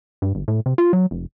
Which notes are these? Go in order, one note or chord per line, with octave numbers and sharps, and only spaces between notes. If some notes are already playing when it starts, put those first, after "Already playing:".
G2
G1
A2
C3
F4
F#3
F1